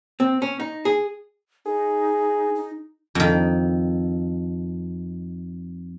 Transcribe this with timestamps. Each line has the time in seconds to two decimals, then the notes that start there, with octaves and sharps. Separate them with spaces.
0.20 C4
0.42 C#4
0.60 D#4
0.85 G#4
1.66 D#4 G#4
2.55 D#4
3.15 F2 D#3